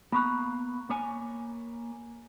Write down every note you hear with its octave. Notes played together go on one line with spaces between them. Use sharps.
A#3 B3 A#5 B5 C#6 F#6
A#3 C#5 G#5